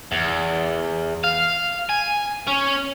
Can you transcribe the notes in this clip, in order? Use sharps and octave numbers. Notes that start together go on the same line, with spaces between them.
E2
F5
G#5
C#4